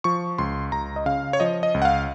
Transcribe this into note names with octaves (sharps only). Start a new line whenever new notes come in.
F3 C#6
C#2 C6
C#2 A#5
D#5
C#3 F5
C#5
F3 D#5
D#5
C#2
F#5
F5